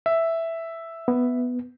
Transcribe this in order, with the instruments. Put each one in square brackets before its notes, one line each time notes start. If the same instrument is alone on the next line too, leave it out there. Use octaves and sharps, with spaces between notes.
[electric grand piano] E5
[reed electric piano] B3